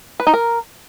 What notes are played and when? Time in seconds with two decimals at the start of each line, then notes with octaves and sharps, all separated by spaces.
0.20 B4
0.27 D#4
0.34 A#4